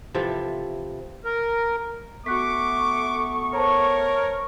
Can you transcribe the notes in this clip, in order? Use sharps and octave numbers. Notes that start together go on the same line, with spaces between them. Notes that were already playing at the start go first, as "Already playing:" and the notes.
C3 E3 F3 A4
A#4
A3 B3 F#4 C#6 D6 F#6 B6
A#4 C5 C#5 A5 A#5